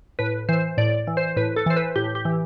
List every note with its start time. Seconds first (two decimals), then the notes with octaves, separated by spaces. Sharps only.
0.19 A2 B4
0.49 E3 C5
0.78 A2 D5
1.07 E3
1.17 C5
1.36 A2 B4
1.56 A4
1.66 E3 C5
1.77 B4
1.96 A2 G4
2.15 G4
2.25 E3